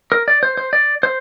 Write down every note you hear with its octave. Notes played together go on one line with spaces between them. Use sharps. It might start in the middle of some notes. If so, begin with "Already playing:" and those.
A#4
D5
C5
C5
D5
C5